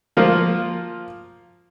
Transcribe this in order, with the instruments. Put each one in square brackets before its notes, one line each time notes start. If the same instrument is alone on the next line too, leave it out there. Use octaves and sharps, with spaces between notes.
[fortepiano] F3 A#3 F4